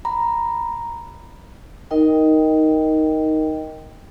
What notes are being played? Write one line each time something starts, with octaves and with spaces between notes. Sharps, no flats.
A#5 B5
D#4 A#4 D#5 G5